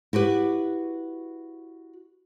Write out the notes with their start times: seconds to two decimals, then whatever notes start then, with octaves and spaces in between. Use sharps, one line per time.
0.13 E4 F#4 G4 B4